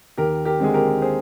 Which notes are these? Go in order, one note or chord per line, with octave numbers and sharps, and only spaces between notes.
D#2 G4 A#4
G4 A#4
D3 G#3 C4 G#4
G4 A#4
G#4 C5